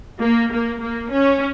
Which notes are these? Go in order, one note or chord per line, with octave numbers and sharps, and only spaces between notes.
A#3
A#3
A#3
C#4